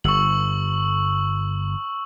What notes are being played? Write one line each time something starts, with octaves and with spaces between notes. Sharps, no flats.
G1 C#6 E6 F#7